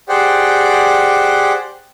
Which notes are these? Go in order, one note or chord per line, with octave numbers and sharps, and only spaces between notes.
G4 G#4 C5 D5 F#5 G5